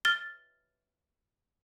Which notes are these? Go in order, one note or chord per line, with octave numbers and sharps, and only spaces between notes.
F6 A6 G7